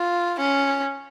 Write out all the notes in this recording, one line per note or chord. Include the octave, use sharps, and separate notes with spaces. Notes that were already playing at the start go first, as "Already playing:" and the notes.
Already playing: F4
C#4